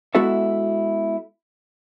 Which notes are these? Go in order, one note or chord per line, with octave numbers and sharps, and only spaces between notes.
G#3 B3 E4 F#4 A4 E5